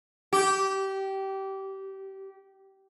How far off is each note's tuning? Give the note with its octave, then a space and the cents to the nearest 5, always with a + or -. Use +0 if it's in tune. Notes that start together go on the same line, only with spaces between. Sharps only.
G4 -20